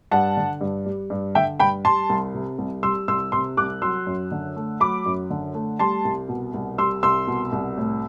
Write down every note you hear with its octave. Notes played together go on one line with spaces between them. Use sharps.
G2 F#5 A5
D3
G2
G3
G2
D3 E5 G5
G2 G5 B5
G3 A5 C6
C2
C3
C2
G3 C6 E6
C2 C6 E6
C3 C6 E6
C2 D6 F#6
F#3 C6 E6
F#2
D3
A3
F#3 B5 D6
F#2
D3
A3
G3 A5 C6
C2
B2
C2
G3 C6 E6
C2 C6 E6
B2
C2
A2